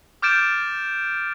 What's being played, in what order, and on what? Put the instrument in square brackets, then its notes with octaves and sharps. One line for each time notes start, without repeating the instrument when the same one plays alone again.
[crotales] D6 F6 G6 A6 D7 E7